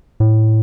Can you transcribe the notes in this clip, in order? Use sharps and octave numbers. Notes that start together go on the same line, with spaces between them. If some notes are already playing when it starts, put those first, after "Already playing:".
A2